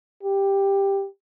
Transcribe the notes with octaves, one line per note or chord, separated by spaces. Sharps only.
G4